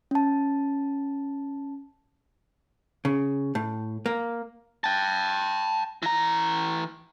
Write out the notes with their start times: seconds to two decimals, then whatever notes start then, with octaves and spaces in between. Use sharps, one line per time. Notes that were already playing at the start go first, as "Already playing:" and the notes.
0.11 C#4 A5
3.05 C#3
3.55 A2
4.06 A#3
4.84 G5 A5
6.02 E3 A#5